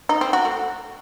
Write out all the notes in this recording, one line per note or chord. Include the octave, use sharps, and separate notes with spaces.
D#4
C4
F#4
A3